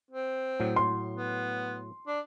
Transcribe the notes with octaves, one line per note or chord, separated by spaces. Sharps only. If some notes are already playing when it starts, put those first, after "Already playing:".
C4
A2 F#3
C6
B3
D4